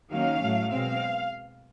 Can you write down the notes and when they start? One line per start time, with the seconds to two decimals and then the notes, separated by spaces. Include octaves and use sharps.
0.11 D#3 F#3 A#3 C#4 F5
0.41 A2 F#3 A3
0.71 B2 G#3 C4 F5